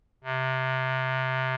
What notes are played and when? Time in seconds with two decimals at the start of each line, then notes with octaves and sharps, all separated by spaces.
0.24 C3